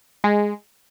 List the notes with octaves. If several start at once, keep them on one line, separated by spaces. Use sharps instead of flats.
G#3